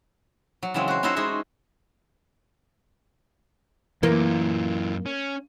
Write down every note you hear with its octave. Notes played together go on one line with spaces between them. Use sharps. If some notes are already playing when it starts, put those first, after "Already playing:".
F#3
C#3 E3 F#3 G#3 C4
F#4 C5
C#4 D#4 E4 F#4 A4 C5
G#3 C#4 D#4 G#4 C5 E5
F#2 E3 A#3 F4
C#4